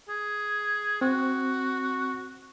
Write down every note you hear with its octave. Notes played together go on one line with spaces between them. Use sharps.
G#4
C4 F#4